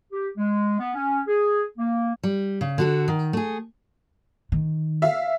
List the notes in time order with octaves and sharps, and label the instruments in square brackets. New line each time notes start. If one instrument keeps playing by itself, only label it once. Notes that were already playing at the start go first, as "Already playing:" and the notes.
[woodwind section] G4
G#3
B3
C#4
G#4
A#3
[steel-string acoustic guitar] G3
C#3
D3 F#4 A4
D#3
A3 G#4
[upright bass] D#3
[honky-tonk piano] E5 F5